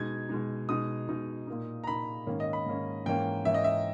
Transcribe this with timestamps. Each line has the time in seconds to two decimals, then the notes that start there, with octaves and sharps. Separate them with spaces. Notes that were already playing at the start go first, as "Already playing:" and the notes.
Already playing: B2 G#3 D#4 G#6
0.29 B2 G#3 D#4
0.69 B2 G#3 D#4 D#6
1.08 B2 G#3 D#4
1.47 A#2 A#3 D#4
1.84 A#5
1.87 A#2 A#3 D#4 B5
2.27 G#2 D#3 A#3 C#4
2.40 D#5
2.53 B5
2.66 G#2 D#3 A#3 C#4
3.06 G#2 E3 A#3 C#4 G5
3.45 G#2 E3 A#3 C#4 E5
3.54 D#5
3.64 E5